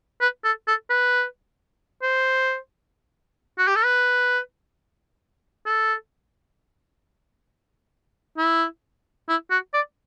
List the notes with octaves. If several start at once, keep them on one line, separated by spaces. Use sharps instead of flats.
B4
A4
A4
B4
C5
F#4
G4
A4
B4
A4
E4
E4
F#4
D5